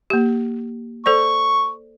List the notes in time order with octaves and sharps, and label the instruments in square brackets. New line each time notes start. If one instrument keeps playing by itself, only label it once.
[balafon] A#3 G4
[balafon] A4 C5 D5 [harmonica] C#6